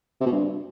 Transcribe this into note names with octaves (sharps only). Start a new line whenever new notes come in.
C3
B2
G2